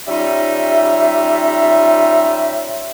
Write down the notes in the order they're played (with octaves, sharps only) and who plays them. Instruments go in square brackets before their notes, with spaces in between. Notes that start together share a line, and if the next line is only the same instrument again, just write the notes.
[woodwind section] G3 C#4 D#4 F4 E5